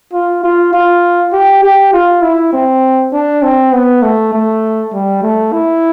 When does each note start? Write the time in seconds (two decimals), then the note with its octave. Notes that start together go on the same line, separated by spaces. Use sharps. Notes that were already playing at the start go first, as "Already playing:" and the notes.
0.13 F4
0.44 F4
0.73 F4
1.33 G4
1.63 G4
1.93 F4
2.23 E4
2.53 C4
3.13 D4
3.43 C4
3.73 B3
4.03 A3
4.33 A3
4.93 G3
5.23 A3
5.52 E4